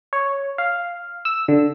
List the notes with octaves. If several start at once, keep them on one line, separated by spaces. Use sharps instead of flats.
C#5
F5
E6
D3